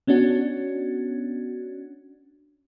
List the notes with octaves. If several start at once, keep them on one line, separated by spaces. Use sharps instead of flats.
B3 C#4 D4 F#4